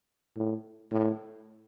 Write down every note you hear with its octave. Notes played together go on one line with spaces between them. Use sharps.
A2
A2